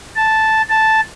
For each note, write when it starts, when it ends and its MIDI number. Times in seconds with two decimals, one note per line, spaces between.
0.16 0.62 81
0.70 1.01 81